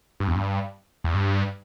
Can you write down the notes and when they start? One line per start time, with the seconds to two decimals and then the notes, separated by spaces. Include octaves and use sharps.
0.20 G2
0.28 E2
0.35 G2
1.04 E2
1.15 G2